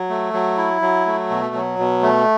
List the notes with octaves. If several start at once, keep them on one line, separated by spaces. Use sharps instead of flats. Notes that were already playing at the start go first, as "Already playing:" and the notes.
Already playing: F#3
A3
F#3
E4
F#3
A3
B2
F#3
B2
A3